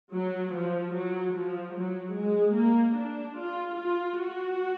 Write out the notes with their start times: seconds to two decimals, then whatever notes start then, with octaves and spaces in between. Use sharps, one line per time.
0.14 F#3
0.55 F3
0.96 F#3
1.36 F3
1.77 F#3
2.18 G#3
2.58 A#3
2.98 D4
3.39 F4
3.79 F4
4.20 F#4